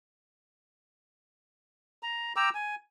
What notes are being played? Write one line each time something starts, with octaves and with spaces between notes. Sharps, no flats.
A#5
G5 A#5 D6 E6
G#5